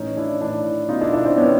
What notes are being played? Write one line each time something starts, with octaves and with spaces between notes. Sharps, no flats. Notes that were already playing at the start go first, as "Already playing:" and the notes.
Already playing: A2 E3 C#4 D#4
D4 E4
A2 E3 D4 E4
B2 D#4 F4
D4 E4
D4 E4
C4 D4
B2 B3 C#4